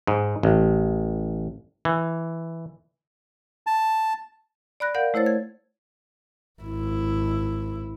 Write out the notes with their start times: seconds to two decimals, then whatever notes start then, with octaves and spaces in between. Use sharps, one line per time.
0.07 G#2
0.43 A1
1.85 E3
3.67 A5
4.80 D5 B5 F#6 A#6
4.95 A#4 D5 F5 F#5 G6
5.14 A3 E4 C5 C#5 A6
5.26 G#6
6.62 G#1 E4